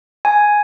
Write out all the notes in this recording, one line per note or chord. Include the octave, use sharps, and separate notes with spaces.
G#5